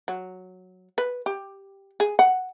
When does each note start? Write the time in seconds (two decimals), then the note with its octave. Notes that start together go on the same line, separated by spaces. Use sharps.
0.08 F#3
0.98 B4
1.26 G4
2.00 G#4
2.19 F#5